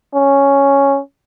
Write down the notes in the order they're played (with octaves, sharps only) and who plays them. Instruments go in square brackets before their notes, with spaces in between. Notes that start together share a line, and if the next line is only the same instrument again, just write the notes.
[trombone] C#4